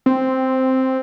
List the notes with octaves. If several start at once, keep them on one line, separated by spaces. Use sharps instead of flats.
C4